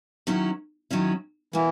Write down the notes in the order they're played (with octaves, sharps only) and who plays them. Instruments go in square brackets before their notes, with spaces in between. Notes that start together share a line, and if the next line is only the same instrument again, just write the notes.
[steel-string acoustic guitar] D#3 F#3 C#4 E4
D#3 F#3 C#4 E4
[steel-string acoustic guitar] B2 A#3 [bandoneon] E3